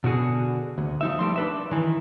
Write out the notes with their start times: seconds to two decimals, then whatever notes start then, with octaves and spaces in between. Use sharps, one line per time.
0.04 B2 D3 F#4 G#4
0.78 D2
1.01 F3 D#4 E5
1.19 G3 A3 C6
1.36 D4 B4 E5
1.71 D#3 E3